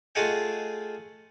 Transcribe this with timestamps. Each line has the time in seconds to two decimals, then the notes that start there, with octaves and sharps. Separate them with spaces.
0.15 A3 F4 G#4 D#5 F#5 G5